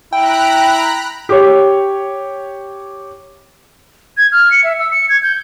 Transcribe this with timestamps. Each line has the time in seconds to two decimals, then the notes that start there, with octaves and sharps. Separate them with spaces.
0.13 E4 G5 A#5 B5 F#6
1.29 G4 C#5
4.17 G#6
4.32 F6
4.51 C#7
4.64 E5
4.79 E6
4.91 C#7
5.09 G#6
5.23 G6